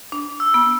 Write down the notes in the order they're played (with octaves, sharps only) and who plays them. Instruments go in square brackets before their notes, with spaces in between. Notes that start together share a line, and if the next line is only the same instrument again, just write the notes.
[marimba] D4
[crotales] E6
[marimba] B3